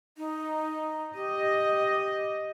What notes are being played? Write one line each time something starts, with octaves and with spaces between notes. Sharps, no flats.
D#4
G4 D#5